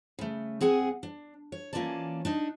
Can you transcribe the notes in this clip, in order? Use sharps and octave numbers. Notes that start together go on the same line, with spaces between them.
C#3 A3
C4 G#4 F#5 G#5
D4
C#5
E3 A#3 C#4 F4 D5 A5
D4 D#4 D#5